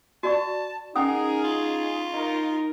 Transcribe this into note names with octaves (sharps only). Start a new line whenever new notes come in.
F#4 D5 A5 C#6
C#4 D#4 G#4 A#4 F#5 D#6
F4
D#4 A#4